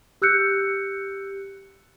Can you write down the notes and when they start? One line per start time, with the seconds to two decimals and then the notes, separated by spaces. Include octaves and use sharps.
0.22 G4 E6 F#6 G6 C#7